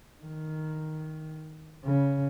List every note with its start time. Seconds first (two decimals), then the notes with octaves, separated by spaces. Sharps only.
0.23 D#3
1.85 C#3